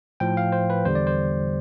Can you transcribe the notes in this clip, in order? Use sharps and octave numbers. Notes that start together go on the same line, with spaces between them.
A2 F3 G5
F5
C5
B4
E2 D3 G3 C5
D5
C5